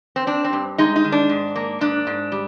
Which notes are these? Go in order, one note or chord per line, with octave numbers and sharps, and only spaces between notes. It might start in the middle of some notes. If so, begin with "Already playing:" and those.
C4
C4 D4
C4
G2
G#3 D#4
D#4
D#3
D4
G#2
A#3
G#2 D4
G#2
G3